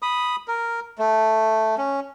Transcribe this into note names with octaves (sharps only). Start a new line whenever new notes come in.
B5 D#6
A#4
A3
C#4